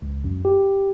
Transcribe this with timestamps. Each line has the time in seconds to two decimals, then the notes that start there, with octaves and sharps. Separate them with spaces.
0.02 C#2
0.24 F#2
0.45 G4